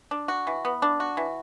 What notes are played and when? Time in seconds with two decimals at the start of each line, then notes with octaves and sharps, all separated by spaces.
0.11 D4
0.28 F#4
0.47 E3
0.65 B3
0.82 D4
1.00 F#4
1.17 E3